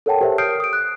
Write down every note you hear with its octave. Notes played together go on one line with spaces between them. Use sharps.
A4 A#4 C#5 F#5 G5 A5
G4 A#4 C5 C#5 E5
D#6 F6 G6 C7 D7
D#6 D7
F#6